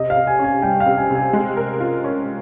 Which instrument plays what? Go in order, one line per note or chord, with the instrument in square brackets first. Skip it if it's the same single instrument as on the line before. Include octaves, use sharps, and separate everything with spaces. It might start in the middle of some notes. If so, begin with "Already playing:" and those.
Already playing: [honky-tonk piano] C3 [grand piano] D#5
[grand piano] F5
[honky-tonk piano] C3
[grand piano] G#5
[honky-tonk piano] C#4
[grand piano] G#5
[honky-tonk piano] G3 [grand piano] G5
[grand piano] F5
[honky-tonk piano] C3
[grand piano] G#5
[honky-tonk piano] C3
[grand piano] G#5
[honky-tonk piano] G#3
A#4
F4
C#4